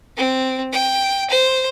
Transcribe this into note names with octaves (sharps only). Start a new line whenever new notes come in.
C4
G5
C5